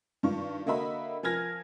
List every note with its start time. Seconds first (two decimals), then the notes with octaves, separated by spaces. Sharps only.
0.23 G2 D#3 F4 C#6
0.66 D3 A#3 F#4 D#5 E5 B5
1.23 F3 A#4 G#5 F6 G#6 A#6